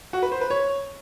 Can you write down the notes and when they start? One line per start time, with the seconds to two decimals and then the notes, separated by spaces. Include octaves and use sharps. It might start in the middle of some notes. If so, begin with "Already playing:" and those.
0.13 F#4
0.23 B4
0.32 C5
0.41 B4
0.50 C#5